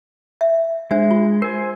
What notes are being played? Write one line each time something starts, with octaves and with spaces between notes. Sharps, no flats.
E5
G#3 D4 C5 E5
F4
A#4 C5 G#5